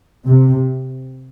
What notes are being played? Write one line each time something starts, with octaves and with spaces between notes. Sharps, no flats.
C3